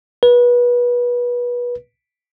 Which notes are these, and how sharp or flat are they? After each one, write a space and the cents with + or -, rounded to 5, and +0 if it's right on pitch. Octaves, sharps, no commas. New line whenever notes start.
B4 -25